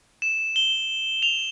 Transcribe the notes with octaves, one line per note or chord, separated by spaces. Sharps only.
E7
G7
F7